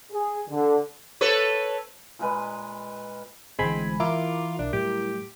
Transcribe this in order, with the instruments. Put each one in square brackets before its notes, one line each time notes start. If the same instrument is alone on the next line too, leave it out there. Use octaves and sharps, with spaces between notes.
[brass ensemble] G#4
D3
[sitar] A4 B4 C#5
[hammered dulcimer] A#2 G#3 B4
[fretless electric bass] A1 D3 E3 [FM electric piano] G#3 G#5 B5 [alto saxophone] C4
[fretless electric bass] E3 [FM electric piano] E4 A#4 D6 [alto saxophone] F4
[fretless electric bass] B1 [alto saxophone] D4
[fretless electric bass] A2 F#3 G3 [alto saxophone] G4